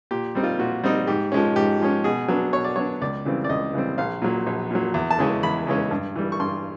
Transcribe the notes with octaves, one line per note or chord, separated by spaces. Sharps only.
A#2 G4
G3 C4 D#4
F4
A#2 F#4
G3 C4 D#4
G#2 G4
F3 G#3 C#4
G#2 G4
F3 G#3 C#4
B2 G#4
F#3 B3 D4
B2 C#5
D5
F#3 B3 D4 C#5
C#2 D5
C#3 E3 G3 C4
D5
C#2 D#5
C#3 E3 G3 C4
A#1 F5
A#2 F#3
A#1
A#2 F#3
E2
A5
C#3 E3 G#3 C#4
E2 B5
C#3 E3 G#3 C#4
G2
E3 G3
C#6
G2 C6